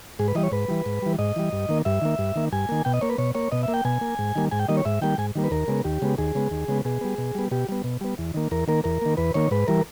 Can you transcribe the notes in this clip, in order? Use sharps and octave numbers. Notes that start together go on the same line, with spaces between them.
G#2 G#4
B4
E3 G3 D#5
C#5
G#2 B4
E3 G3
G#2
E3 G3
G#2 D#5
E3 G3
G2
D#3 A#3
G2 E5
D#3 A#3
G2
D#3 A#3
G2 G#5
D#3 A#3
B2 G5
D#5
A#3 C#5
B4
B2 C#5
A#3 C#5
B2 D#5
A#3 E5
G5
B2 G#5
A#3
G#2
D#3 G3 A#3
G#2 G#5
G5
D#3 G3 A#3 D#5
C#5
G#2 E5
D#3 G3 A#3 G5
G#2 G#5
D#3 G3 A#3
B4
D#2 A#4
C#3 G#3 B3
D#2 G4
C#3 G#3 B3
D#2 G#4
C#3 G#3 B3
D#2
C#3 G#3 B3
B2 G#4
G3 B3
B2
G3 B3
B2 G4
G3 B3
B2
G3 B3
E2
D#3 A#3
E2 A#4
D#3 A#3 A#4
E2 A#4
D#3 A#3
E2 B4
D#3 A#3 C#5
G#2 B4
E3 G3 A#4